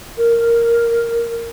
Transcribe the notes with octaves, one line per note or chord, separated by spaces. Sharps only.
A#4